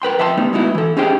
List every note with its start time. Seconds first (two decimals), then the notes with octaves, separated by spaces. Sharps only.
0.02 A#4 B4 G5 C6
0.19 F2 E5 G5 A5 C6
0.37 G3 A3 B3 D#4
0.53 G#3 B3 D#4 E4 F#4
0.75 E3 A4
0.97 C#4 D#4 G4 G#4 C5 G5